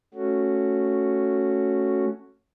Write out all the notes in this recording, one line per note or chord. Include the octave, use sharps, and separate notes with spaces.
A3 C#4 F#4